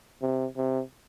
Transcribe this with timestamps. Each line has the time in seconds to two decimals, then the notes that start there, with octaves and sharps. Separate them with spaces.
0.22 C3
0.57 C3